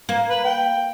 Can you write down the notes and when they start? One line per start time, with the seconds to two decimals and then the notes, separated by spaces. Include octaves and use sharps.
0.09 A#3
0.30 B4
0.44 G5